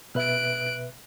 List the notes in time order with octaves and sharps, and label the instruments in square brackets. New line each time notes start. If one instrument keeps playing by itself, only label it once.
[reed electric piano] B2 B4 E5 [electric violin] F#6 D7